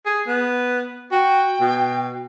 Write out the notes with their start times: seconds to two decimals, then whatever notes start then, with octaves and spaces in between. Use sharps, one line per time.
0.06 G#4
0.27 B3
1.11 F#4 G5
1.60 B2